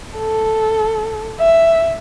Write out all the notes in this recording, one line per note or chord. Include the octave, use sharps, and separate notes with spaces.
A4
E5